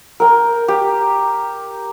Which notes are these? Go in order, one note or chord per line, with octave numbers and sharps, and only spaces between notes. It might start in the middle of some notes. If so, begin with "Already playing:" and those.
A#4 G5
G4